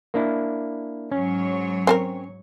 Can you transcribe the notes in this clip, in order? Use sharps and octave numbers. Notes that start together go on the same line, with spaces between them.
A#3 D4 E4
G#2 F#3 C#4 C#5
C4 A4 A#4